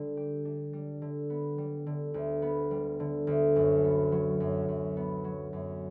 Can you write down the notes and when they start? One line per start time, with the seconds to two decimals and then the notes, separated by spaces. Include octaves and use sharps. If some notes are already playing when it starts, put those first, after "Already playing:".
Already playing: D3 G3 D4
0.17 G4
0.45 D4
0.73 G3
1.02 D3
1.30 B3
1.58 G3
1.87 D3
2.14 D2
2.42 B3
2.71 G3
3.00 D3
3.27 D2
3.56 F#2
3.84 B3
4.12 F#3
4.40 F#2
4.68 F#2
4.97 B3
5.24 F#3
5.53 F#2